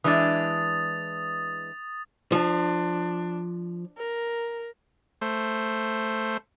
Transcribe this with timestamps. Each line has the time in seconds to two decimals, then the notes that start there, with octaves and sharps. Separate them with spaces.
0.04 E3 G#3 D4 D#6 A6
2.32 F3 D4
3.97 A#4
5.21 A3 C5